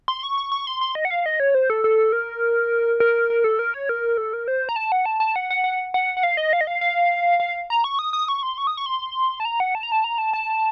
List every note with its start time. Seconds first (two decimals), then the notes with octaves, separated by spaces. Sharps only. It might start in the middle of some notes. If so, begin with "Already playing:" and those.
0.08 C6
0.23 C#6
0.37 C#6
0.52 C#6
0.67 C6
0.81 C6
0.95 D#5
1.05 F#5
1.10 F5
1.26 D#5
1.40 C#5
1.55 C5
1.70 A4
1.84 A4
2.12 A#4
3.00 A#4
3.30 A#4
3.44 A4
3.59 A#4
3.74 C#5
3.89 A#4
4.18 A4
4.33 A#4
4.48 C5
4.69 A#5
4.76 A5
4.92 F#5
5.06 A5
5.20 A5
5.36 F#5
5.50 F#5
5.64 F#5
5.94 F#5
6.17 F#5
6.23 F5
6.37 D#5
6.53 F5
6.61 D#5
6.67 F5
6.81 F5
7.40 F5
7.70 A#5
7.84 C#6
7.99 D#6
8.13 D#6
8.28 C#6
8.43 C6
8.58 C#6
8.67 D#6
8.77 C#6
8.86 C6
9.40 A5
9.45 A#5
9.60 F#5
9.75 A5
9.83 A#5
9.92 A5
10.04 A#5
10.18 A5
10.33 A5